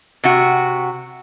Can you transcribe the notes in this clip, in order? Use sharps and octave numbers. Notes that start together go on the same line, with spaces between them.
C3 F#4